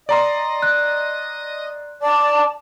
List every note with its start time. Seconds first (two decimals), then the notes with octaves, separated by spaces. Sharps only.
0.09 D5 D#5 A#5 C6
0.62 F#6
2.02 D5 A5